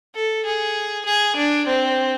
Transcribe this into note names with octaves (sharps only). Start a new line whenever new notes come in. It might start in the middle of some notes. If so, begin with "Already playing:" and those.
A4
G#4
G#4
D4
C4